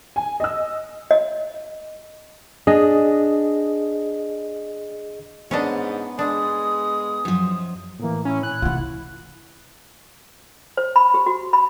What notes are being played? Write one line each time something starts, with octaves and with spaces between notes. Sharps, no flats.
G#5
D#5 E6
D#5
D4 G#4 D#5
G#2 B3 C#4 D4 D#5
G#3 D4 D#6
F#2 F3
A2 E3 A#3
C#4 E4
A#2 G#5 F#6
C3 E3 F4 F#5
C5
B5
G4
F#4
B5